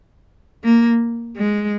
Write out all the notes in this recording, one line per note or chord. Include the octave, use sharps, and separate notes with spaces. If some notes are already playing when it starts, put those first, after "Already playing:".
A#3
G#3